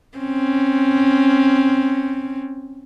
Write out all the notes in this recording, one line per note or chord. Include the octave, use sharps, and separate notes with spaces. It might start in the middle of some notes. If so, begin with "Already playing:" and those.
C4 C#4